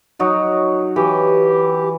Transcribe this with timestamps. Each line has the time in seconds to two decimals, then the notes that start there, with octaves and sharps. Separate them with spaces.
0.19 F#3 D#4 F#4
0.96 E3 G4